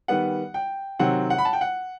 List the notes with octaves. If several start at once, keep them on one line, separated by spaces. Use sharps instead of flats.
D#3 G3 B3 F#5
G5
C3 D#3 F#3 C4 F#5
F#5
B5
A5
G5
F#5